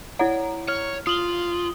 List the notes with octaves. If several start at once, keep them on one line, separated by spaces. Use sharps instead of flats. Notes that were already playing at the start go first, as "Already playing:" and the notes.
E4 C#5 D5 F#5 A#5
C#5 F6
F4 D#6 F#7 G7